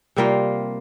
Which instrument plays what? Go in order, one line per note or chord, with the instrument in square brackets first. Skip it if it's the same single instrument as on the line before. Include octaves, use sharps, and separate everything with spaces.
[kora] C3 G3 A#3 F4